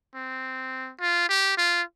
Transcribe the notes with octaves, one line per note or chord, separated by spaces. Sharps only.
C4
F4
G4
F4